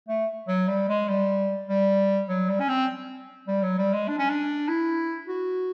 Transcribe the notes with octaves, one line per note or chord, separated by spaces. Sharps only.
A3
F#3
G3
G#3
G3
G3
F#3
G3
C#4
C4
G3
F#3
G3
G#3
D4
C#4
D4
E4
F#4